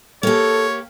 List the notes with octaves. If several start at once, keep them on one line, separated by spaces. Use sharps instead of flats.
A#3 G4 A4 C#5